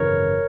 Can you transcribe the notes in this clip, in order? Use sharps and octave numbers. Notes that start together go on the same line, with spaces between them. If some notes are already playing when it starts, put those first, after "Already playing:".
Already playing: G#1 F#2 C#3 E3 A#4 C#5